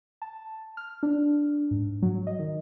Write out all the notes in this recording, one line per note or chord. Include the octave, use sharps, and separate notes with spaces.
A5
F6
D4
G#2
F#3
D#5
D#3